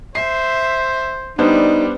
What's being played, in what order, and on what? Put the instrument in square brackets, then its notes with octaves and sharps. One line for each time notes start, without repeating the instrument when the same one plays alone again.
[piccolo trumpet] C5 [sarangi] E5 [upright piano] C7
[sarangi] G3 [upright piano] B3 D4 C5 [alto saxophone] D#4